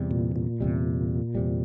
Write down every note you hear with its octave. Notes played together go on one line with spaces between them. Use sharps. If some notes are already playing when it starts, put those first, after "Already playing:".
Already playing: E2 C3 G3
A#2
A#2
E2 C3 G3
E2 C3 G3